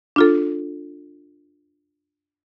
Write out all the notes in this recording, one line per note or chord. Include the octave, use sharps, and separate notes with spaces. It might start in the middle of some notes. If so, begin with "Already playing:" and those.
D4 F4 A4